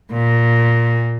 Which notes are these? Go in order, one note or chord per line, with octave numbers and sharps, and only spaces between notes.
A#2